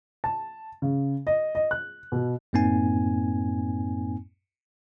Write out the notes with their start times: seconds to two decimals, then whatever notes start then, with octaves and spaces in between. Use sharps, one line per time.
0.24 A5
0.82 C#3
1.27 D#5
1.55 D#5
1.71 F#6
2.12 B2
2.53 F#2 A2 A#3 C4 D#4 G#5